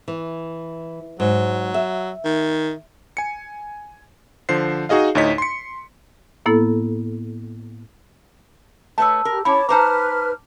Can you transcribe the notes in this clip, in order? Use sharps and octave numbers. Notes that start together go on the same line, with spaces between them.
E3
G#2 F#3
E5
D#3
G#5 C#7
D3 F3 C5 C7
D#4 F#4 G#4 D#5 F5
D2 A2 D#4 C#5 D#5 B6
C6 C#7
A2 A#3 B3 E4 A4
A3 B4 C#5 A5 E6
G4 A#4
C#4 E4 C#5 A5 B5 D6
D#4 B4 C5 A5 A#5 D6 F6